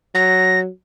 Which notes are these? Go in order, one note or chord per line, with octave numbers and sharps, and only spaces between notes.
F#3 A#6